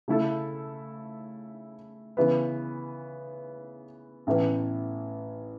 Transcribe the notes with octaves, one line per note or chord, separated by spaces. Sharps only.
C#3 A3 E4 A4
C#3 E3 B3
A1 A2 E3 B3